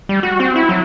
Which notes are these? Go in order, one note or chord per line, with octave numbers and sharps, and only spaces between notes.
G3
F#4
C4
E4
F#3